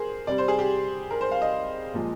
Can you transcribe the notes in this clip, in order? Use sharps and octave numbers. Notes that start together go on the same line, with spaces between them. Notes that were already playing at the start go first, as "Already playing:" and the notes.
Already playing: G#4 A#4 C5
C3 G3 D5
C5
G#4
G4
A#4
C5
F5
D#5
A#2 F3 G#3